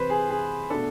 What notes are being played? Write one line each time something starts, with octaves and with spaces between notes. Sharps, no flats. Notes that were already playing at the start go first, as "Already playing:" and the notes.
Already playing: C3 E3 B4 C5
G#4
G#4
B2 A3 D4 A4